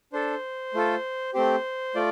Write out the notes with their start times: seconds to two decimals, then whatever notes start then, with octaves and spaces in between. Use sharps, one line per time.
0.13 D4 A4 C5
0.74 A3 F4 A4
1.34 A3 C4 G4 C5
1.95 A3 F4 D5